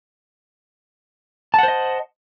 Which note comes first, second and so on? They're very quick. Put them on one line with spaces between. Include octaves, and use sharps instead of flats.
A5 F#5 C5 D#5